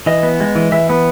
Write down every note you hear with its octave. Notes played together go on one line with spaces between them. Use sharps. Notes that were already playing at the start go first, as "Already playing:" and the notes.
E3 D#5
B3
G#3
E3
E3 E5
B3